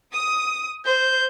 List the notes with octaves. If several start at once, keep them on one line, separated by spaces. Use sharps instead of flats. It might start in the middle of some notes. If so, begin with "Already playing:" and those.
D#6
C5 G6